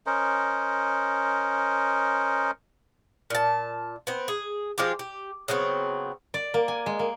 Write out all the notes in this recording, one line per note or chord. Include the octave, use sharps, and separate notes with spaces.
C#4 A#4 C5 D#5
A#2 A5
B3 C4
G#4
F3 G#3 F4 G4
G4
C#3 F#3 B3 C4
D5
A#3
G#5
G#3
A#3